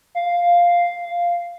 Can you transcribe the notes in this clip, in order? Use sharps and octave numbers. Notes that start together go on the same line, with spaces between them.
F5